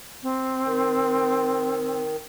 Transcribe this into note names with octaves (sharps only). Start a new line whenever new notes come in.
C4
D#3